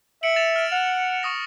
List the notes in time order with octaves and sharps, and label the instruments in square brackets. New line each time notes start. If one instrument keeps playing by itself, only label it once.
[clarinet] E5 [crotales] C#7 D7 F#7
[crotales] A6 E7 F7
F6 D7
[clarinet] F#5 [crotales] F7
[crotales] C#6 D#6 A#6